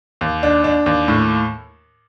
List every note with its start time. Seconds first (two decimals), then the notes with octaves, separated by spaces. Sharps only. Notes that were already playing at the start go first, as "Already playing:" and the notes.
0.21 D#2
0.43 D4
0.64 D4
0.86 D#2
1.08 A2